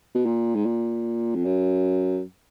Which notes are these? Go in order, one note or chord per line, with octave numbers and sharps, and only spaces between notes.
B2
A#2
G#2
A#2
F2
F#2